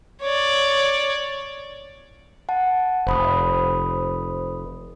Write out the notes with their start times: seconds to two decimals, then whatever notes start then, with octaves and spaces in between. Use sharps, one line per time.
0.22 C#5 D5
2.49 F#5 A5
3.07 F1 C5 B5 D#6